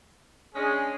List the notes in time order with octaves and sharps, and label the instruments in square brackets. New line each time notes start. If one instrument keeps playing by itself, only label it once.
[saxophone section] G#3 C#4 [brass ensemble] D4 G#4